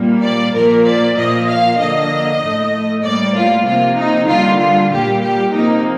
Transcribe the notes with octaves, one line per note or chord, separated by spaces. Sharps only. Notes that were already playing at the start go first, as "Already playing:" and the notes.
Already playing: A#2 G3 A#3
D5
A#2 F3 A#3 A#4
D5
A#2 F3 A#3 D#5
F5
D3 F3 A#3 D#5
A2 A3
A2 G3 A#3 D5
F4
C3 F3 A#3 F4
D#4
D3 G3 A#3 F4
F4
A#2 G3 A#3 G4
G4
C3 F3 A#3 D#4